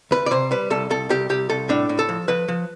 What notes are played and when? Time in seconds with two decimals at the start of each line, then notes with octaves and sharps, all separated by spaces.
0.11 D2 B4
0.26 D5
0.31 C3 C5
0.51 G3 B4
0.70 C2 A4
0.90 C2 A4
1.10 C2 G4
1.30 C2 G4
1.50 C2 A4
1.69 A2 D4
1.89 A2
1.99 A4
2.09 F3
2.28 F3 B4
2.48 F3